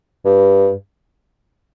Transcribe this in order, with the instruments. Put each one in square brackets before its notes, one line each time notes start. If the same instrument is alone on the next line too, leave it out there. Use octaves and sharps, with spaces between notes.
[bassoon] G2